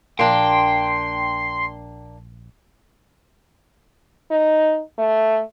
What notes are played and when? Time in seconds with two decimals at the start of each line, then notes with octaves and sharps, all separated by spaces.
0.19 A#1 A#3 D4 G5 C6
4.31 D#4
4.98 A3